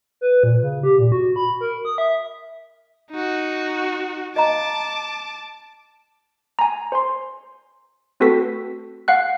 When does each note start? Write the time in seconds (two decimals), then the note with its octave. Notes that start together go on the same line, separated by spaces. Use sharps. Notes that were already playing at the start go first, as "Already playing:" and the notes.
0.21 B4
0.43 A#2
0.63 C#3
0.83 G4
0.99 A#2
1.12 F#4
1.36 B5
1.61 A#4
1.85 D#6
1.98 E5
3.11 D#4 F#4
4.36 D#5 F5 A5 A#5 D6
6.59 G#5 A#5
6.92 C5 G#5 C6
8.20 A3 C4 F#4 A4 B4 B6
9.08 F5 F#5 F#6